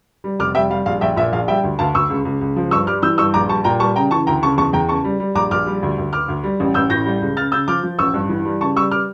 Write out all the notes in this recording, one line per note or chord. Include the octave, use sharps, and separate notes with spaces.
G3
F1 D6 F6
G3 E5 G5
G3 F5
A#1 F5
A#1 E5 G5
A#2 E5
A#1 F5
G3 E5 G5
D2
D2 F5 A5
D2 C#6 E6
C#2
C#2
C#2
F3
G2 C#6 E6
G3 D6 F6
E3 E6 G6
G2 C#6 E6
A#1 A#5 D6
G3 A5 C#6
A#2 G5 A#5
G3 A5 C#6
C#3 G5 A#5
E3 A5 C#6
D2 G5 A#5
C#3 A5 C#6
E2 A5 C#6
E2 G5 A#5
C#3 A5 C#6
G3
G3
A#1 A#5 D6
A#1 D6 F6
G3
D2
D2
D2 D6 F6
D2
G3
A1
A1 E6 G6
A2 G6 A#6
G3
C#2
C#3 F6 A6
C#3 E6 G6
F3 D6 F6
F3
A1 C#6 E6
G2
E3
G3
C#3 A5 C#6
G3 C#6 E6
D6 F6